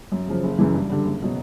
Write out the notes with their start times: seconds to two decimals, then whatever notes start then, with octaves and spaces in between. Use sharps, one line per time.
0.12 F#2
0.27 C#3 F3
0.43 F#1
0.59 F#2 C#3 E3
0.74 G2
0.90 D3 G3
1.05 F#1
1.23 B2 F#3